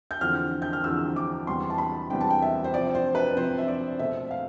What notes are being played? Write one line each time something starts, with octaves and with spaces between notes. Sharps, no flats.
G6
E2 D3 F3 C4 F6
G6
F6
E2 D3 F3 C4 E6
D6
E2 C3 G3 B3 C6
A5
B5
E2 C3 G3 B3 G5
A5
G5
E5
C5
C3 F3 C4 D5
C5
B4
C3 F3 C4 C5
E5
D5
B2 A3 C4 E5
F5